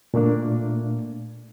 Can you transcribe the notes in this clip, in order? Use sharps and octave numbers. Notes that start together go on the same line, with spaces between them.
A#2 A3 A#3 D4